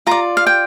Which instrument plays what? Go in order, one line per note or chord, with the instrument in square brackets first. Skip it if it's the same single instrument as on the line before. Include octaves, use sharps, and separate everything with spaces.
[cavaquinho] F4 D5 A#5
F5
G5